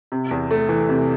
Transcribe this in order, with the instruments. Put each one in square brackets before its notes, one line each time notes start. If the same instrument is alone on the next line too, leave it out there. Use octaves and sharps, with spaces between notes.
[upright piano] C3
E2
A3
E3
C3